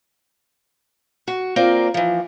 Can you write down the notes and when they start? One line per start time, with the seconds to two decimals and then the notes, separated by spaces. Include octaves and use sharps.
1.28 F#4
1.56 A#3 C4 F4 A#4 D5
1.94 E3 F3